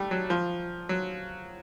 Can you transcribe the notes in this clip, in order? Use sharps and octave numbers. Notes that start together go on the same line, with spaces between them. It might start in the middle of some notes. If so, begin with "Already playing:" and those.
Already playing: G3 A3
F#3
F3
F#3